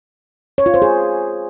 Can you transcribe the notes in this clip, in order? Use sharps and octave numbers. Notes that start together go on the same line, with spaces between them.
C#5
F4
C5
G#4